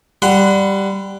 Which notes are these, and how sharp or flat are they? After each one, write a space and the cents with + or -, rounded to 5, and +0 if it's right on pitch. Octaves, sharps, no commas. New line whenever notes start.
G3 +0 F#5 +0 C6 -40